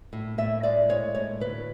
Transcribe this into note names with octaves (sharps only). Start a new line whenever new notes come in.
A2
A2 E5
G#3 D5
G#3 C#5
A2 C#5
D2 B4